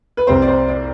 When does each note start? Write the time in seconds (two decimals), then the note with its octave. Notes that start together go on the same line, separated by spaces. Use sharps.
0.17 B4
0.27 C2 C3 G3 C4 C5
0.42 D5
0.48 C5
0.68 D5